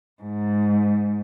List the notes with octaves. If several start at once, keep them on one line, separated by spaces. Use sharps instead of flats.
G#2